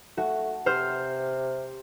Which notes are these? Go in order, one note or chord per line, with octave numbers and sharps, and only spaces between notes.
A3 F#4
C3 C5 F6